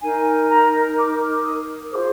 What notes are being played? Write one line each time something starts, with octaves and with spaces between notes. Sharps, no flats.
D#4 A#4 G#5
A#5
D6
D#6
F4 G#4 C5 D6